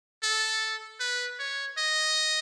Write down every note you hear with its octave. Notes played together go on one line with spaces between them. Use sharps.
A4
B4
C#5
D#5